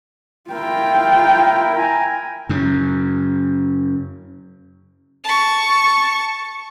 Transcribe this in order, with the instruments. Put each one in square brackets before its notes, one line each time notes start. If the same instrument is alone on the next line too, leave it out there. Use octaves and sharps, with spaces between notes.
[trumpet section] E4 A#4 [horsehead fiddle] F4 G5
[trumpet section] G#5 A#5
[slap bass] F#2 C#3
[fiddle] A5 C#6